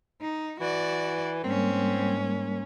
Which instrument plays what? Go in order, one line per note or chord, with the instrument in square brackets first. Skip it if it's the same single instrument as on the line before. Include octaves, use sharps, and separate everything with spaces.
[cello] D#4
[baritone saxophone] E3 [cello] F#4 D5
[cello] G#2 C#4 [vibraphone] G3 A#3 A#4 [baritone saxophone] C4